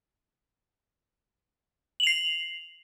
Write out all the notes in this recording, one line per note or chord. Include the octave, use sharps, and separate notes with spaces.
C7 F7 F#7